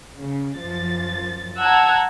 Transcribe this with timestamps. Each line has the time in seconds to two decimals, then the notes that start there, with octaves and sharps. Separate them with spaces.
0.18 C#3
0.58 F#2 F3 A6
1.59 F#5 A5 A#5 E6 F#6 G#6